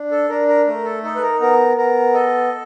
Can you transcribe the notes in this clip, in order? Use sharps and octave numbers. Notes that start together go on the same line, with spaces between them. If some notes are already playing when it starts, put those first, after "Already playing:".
Already playing: D4
A4
D4 A#4
A#4
A3 A#4
A4
D#4 A4
B4
A#4
B3 A#4
B3 A#4
A4 D#5